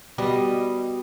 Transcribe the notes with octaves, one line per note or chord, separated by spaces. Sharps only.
B2 G3 D#5